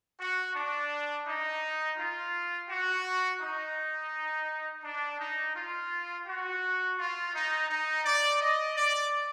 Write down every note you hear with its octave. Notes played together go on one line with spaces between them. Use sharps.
F#4
D4
D#4
F4
F#4
D#4
D4
D#4
F4
F#4
F4
D#4
D#4
D5
D#5
D5